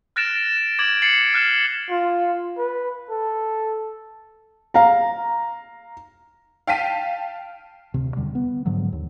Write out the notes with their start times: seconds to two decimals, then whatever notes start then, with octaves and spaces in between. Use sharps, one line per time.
0.16 F6 F#6 A6 A#6 D7 E7
0.79 D6 G#6 D7 F#7
1.02 A6 C7 C#7 F#7
1.34 F6 F#6 E7
1.90 F4
2.58 B4
3.10 A4
4.74 F5 A#5
6.67 F5 G5 A5 B6 D#7
7.94 D2 C3
8.17 E2 D3 G3
8.35 B3
8.66 G#2 D3 F3 F#3
8.92 D#2